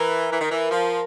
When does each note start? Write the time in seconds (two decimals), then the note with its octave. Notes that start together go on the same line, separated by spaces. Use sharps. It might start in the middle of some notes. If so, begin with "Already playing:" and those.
Already playing: E3 A#4
0.30 E3
0.41 D#3
0.51 E3
0.71 F3